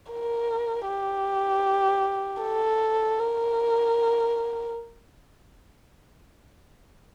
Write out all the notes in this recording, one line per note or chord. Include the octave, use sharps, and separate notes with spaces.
A#4
G4
A4
A#4